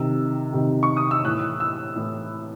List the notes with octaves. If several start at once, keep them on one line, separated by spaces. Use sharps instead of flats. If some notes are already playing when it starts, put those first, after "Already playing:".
Already playing: C3 D#3 E6
C3 D#3
C#6
D#6
E6
A2 E3 F#6
E6
A2 E3